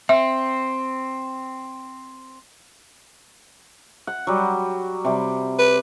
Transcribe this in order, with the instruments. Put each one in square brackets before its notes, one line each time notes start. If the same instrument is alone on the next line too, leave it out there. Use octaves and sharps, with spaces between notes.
[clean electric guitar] C4 [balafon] E5
[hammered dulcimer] F#5
F#3 G3
C3 G3
[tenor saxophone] B4